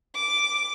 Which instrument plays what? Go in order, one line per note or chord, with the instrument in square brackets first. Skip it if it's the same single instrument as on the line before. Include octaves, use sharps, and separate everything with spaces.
[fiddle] D6